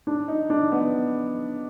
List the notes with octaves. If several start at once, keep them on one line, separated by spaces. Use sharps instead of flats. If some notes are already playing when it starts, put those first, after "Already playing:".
D4
D#4
D4
B3